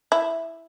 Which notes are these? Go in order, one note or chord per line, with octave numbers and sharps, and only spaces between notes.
E4